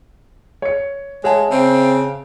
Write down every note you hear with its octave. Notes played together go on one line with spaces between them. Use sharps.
C#5 C#7
G#3 G#4 C#5 E5 F#5 A5
C#3 C4